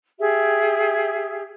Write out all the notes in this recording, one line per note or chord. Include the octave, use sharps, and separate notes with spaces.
G4 G#4 E5